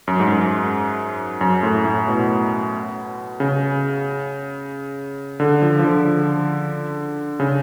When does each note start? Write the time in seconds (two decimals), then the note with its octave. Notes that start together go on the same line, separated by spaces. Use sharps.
0.08 F#2
0.20 G#2
0.32 F#2
1.41 F#2
1.63 A2
1.85 A2
2.08 B2
3.40 C#3
5.40 D3
5.62 F3
5.79 F3
5.84 D3
7.40 C#3